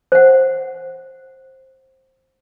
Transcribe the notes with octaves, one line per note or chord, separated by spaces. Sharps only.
C5 F#5